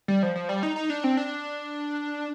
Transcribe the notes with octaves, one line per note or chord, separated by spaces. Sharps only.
G3
F3
F3
G3
D#4
D#4
D4
C4
D4